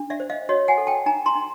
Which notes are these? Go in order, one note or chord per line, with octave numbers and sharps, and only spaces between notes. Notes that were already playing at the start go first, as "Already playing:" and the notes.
Already playing: D4
D5 E5
C5
D#5 F5
F#4 C#5 D#5
F#5 G#5
A4
G5 A5
D#4 G#5 A#5
A#5 C6
D#4